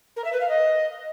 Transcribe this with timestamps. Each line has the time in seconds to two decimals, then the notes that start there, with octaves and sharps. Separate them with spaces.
0.16 A#4
0.24 E5
0.32 B4
0.40 F5
0.48 D#5